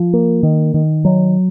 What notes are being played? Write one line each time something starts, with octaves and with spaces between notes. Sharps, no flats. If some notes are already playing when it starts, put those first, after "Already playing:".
Already playing: F3
A#3
D#3
D#3
F#3